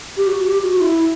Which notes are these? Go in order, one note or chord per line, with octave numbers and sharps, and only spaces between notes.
G4
F#4
G4
F#4
F#4
E4